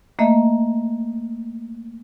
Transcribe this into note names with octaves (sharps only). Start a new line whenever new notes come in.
A3 A#3 D#5 E5